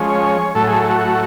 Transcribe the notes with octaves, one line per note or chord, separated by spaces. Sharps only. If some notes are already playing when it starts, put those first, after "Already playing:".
Already playing: F3 G#3 C#4
C#5
A2 F#3 A3 A4
G#4
F#4
F#4